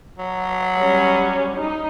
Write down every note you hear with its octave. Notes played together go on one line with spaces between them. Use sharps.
F#3
G3 C#4 C#5
D#4